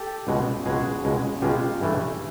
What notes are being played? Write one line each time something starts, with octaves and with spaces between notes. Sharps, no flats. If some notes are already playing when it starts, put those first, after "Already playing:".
Already playing: G4 A4
C#2 B2 G#3
C#2 B2 G#3 F#4 G#4
C#2 B2 G#3
C#2 B2 G#3 F4 G4
G2 E3 A3